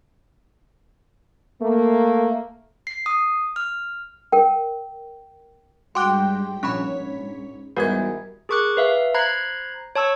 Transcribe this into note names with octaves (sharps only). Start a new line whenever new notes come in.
A3 A#3
C7
D#6
F6
A#4 G5
G2 G3 G#3 F#4 G5 C6 D6 F#6
A#1 G#2 C#4 C#5 B5 B6
E2 G#2 E3 G3 F#4 A#4 G#6
G#4 A#4 C#6 D6 F#6
B4 E5 F5
C5 A#5 B5 F#6 G#6 C7
C#5 A5 C#6 E6